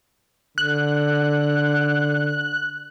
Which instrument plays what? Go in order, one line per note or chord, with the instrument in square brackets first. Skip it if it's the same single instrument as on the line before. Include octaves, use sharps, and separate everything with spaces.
[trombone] D3 [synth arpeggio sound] F#6